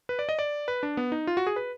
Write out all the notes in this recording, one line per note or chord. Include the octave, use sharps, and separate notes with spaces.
B4
D5
D#5
D5
B4
D4
B3
D#4
F4
F#4
G#4
B4